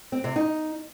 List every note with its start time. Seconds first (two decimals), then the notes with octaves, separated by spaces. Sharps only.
0.12 C4
0.24 C3
0.36 D#4